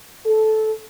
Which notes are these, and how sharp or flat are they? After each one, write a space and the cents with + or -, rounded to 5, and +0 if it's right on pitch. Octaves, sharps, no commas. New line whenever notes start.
A4 -15